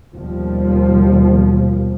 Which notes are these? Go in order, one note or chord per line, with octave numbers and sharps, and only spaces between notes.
D#2 B2 F3 G3